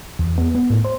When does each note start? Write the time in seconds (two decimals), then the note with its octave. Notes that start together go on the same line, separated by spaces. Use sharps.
0.19 E2
0.38 B3
0.55 B3
0.70 A2
0.85 C5